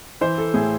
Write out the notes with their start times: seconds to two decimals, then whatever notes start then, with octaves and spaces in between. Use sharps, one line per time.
0.21 E3 C5
0.38 A4
0.54 A2 G#4